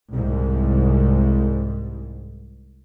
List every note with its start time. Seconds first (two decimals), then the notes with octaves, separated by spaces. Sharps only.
0.14 C2 G#2